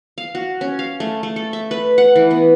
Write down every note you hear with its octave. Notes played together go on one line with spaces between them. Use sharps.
F5
F#4
C#4
F5
A3
A3
A4
E5
B4
F#5
E3
B3